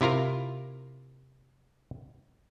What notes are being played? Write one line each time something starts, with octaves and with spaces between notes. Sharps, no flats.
C3 E4 F4 A#4 A#5